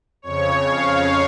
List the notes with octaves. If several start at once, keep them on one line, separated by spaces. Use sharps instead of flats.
F2 C#3 C#5
F5